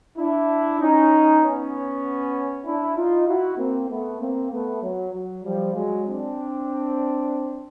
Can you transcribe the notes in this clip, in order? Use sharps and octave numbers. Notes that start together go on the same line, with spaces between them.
D4 E4
C#4 D#4
B3 C#4
D4 E4
D#4 F4
E4 F#4
A#3 C4
A3 B3
A#3 C4
A3 B3
F#3
F#3
F3 G3
F#3 G#3
C4 D4